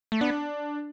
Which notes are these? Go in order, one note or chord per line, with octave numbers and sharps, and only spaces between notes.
A3
B3 D4